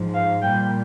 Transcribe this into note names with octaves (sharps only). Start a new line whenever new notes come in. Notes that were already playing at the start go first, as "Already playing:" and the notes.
Already playing: G#2 F3
F5
A#2 G3 G5